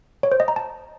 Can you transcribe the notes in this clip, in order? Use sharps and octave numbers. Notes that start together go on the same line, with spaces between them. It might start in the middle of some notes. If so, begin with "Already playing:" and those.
C#5
C5
D#5
A#5
A5